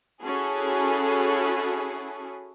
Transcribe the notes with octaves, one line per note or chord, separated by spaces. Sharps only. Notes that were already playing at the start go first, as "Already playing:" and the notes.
C#4 E4 F#4 G#4 A4